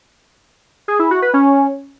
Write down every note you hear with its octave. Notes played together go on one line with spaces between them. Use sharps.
G#4
E4
F#4
B4
C#4